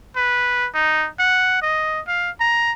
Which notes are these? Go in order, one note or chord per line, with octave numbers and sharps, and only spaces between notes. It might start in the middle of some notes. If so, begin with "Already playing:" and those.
B4
D#4
F#5
D#5
F5
A#5